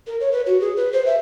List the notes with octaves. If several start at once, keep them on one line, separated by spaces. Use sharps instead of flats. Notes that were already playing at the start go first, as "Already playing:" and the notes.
A#4
C#5
B4
F#4
G#4
B4
C5
E5